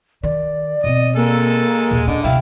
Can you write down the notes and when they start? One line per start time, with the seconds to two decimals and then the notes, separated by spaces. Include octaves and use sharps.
0.23 D#3 D5
0.84 B2 C4 D#5
1.16 G#3 A#3 A4 E6
1.91 D#2 A#2
2.07 D3 C#4 D#5
2.24 D2 C3 E4 F5 G5